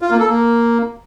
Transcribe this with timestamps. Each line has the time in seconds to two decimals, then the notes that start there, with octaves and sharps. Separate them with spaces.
0.02 F4
0.10 A#3
0.19 A4
0.28 A#3